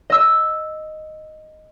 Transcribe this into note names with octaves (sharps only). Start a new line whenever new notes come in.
D#5 E6